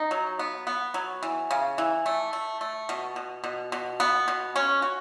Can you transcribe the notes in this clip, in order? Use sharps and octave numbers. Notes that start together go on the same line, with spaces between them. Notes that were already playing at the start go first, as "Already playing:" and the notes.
Already playing: D#4
F#3
B3
B3
F#3
E3
C#3
E3
A3
A3
A3
B2
B2
B2
B2
B3
B2
C#4
F#4